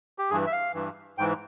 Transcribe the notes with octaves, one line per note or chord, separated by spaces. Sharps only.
G4
G2 E3 G#4
E5
F5
G2 E3
G#2 E3 G5